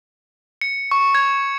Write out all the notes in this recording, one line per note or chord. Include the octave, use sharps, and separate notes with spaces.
C#7
C#6
G#6